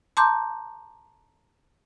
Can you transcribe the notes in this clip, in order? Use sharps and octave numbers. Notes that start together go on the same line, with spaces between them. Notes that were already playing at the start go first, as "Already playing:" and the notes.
A5 A#5 C6 D6 G6